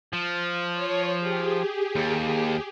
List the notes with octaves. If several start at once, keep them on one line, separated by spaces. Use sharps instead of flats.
F3
C#5
G4 G#4
D#2